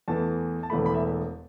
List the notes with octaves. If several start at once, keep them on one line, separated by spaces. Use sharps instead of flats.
E2 E3 A3 A5
A5
E1 E2 E3 A3 B5
B5
E5